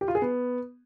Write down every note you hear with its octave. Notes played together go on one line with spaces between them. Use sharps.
G4
F4
G#4
B3